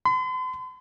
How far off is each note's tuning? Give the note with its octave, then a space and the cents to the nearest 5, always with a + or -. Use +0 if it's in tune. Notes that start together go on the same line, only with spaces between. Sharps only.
C6 -45